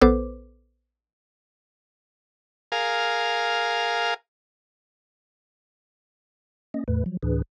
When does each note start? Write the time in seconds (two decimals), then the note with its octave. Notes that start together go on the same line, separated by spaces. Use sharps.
0.01 A#1 B3 A4 B4 C5 D6
2.72 G#4 A#4 F5
6.74 A#3 C#4 D#5
6.88 E2 A2 A3 B4
7.06 F3 F#3
7.23 D2 A2 E3 D4 G#4 B4